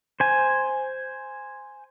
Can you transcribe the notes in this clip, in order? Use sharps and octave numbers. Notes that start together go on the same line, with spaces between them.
C5 G#5